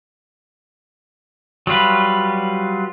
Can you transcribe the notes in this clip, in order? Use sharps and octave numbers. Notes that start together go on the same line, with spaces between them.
F#3 G3 F4 B4